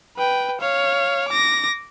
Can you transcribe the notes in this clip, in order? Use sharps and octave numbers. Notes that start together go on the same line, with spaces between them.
B4 G5
C#5 F5
D6 A#6